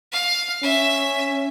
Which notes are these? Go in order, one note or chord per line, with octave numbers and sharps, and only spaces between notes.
F5
C#4 E5